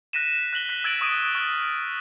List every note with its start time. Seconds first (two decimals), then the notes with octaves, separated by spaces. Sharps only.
0.13 F#6 A#6 B6 D#7 E7
0.53 F#6 A#6 F#7 G7
0.69 F#6 B6
0.84 E6 G#6 A6 D7 F#7
1.01 C#6 D#6 D7 D#7
1.35 C#6 F6 A6